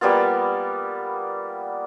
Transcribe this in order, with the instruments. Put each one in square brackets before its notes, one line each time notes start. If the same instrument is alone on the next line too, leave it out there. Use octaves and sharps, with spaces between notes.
[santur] G3 A#3 B3 F4